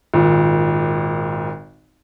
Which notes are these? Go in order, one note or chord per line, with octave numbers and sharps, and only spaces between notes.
G#1 A#2